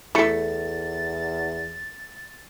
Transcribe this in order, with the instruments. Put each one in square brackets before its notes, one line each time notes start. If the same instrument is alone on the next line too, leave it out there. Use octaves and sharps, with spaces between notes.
[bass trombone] E2 [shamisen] A3 [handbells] E4 C#7 [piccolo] A6